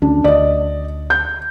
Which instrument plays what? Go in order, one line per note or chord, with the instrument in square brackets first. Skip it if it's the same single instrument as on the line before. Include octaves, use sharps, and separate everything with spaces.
[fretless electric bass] D2 C#4 [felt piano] D4
[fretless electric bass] D2 [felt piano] D5 D#5
[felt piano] G6